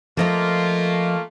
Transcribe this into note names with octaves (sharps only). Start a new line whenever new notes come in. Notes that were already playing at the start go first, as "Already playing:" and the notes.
F3 A3 A#3 F4 D#5 A#5